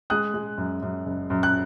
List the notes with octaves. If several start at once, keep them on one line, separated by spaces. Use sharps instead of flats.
G#3 D#6 F#6
G#3
F#2
F#2
F#1
F#2
F#6